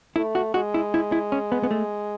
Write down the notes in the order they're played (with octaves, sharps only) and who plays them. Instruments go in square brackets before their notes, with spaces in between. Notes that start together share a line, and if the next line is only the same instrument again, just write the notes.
[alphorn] A3 [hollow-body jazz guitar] E4
[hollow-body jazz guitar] F#4
[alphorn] G#3 [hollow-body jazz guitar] F#4
[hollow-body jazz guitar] E4
E4
E4
C#4
B3
B3
A3